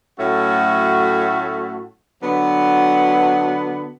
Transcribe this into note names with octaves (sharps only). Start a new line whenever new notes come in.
A2 F#3 A3 C#4 F#4
D3 F#3 B3